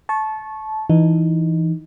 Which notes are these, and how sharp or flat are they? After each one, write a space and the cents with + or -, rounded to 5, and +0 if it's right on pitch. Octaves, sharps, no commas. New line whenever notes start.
A5 -20 C#6 -15
E3 +0 D#4 +0